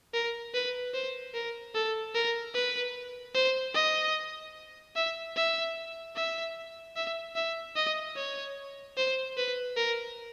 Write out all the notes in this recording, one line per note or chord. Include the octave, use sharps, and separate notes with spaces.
A#4
B4
C5
A#4
A4
A#4
B4
C5
D#5
E5
E5
E5
E5
E5
D#5
C#5
C5
B4
A#4